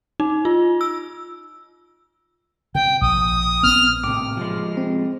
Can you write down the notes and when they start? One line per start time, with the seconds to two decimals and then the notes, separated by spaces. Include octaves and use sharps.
0.20 D#4
0.45 F4
0.81 E6
2.75 C3 G5
3.01 A#1 D#6
3.63 B3 C4 F6
4.04 A2 C3 D6
4.37 F3 G#3
4.77 C4